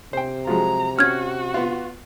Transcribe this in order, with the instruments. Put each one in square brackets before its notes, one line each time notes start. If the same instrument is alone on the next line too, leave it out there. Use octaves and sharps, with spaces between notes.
[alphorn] C3 [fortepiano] C5 G5
[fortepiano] F3 F#3 G#3 [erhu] A#5
[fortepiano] C#4 [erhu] F#4 [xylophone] F6 G#6
[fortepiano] B3 F4